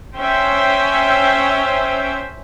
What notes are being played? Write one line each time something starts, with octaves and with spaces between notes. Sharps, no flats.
C#4 C5 E5 G5